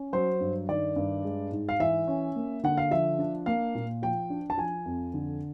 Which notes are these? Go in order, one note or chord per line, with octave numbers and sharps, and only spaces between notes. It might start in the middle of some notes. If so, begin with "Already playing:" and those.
Already playing: C#4
F#3 C5
G2
D#3 D5
G2
G#3
G#2
F5
E3 E5
C#4
A#3
D3 F#5
F5
F3 E5
D4
A#3 F5
A#2
F3 G5
D4
A5
F3 G#5
F2
D3